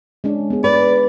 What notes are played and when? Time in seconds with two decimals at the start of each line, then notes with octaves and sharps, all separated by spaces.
0.24 G#3 C#4 D4
0.50 B3 G#4
0.64 B4 D5